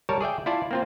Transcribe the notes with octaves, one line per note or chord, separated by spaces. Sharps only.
G3 A#4 C#5 A5
G#4 D5 E5 G5
E4 F4 D5 A5
A#3 C4 F4